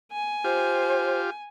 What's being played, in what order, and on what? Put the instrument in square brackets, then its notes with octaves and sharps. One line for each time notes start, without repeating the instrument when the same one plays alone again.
[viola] G#5
[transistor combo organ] F4 G4 [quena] C5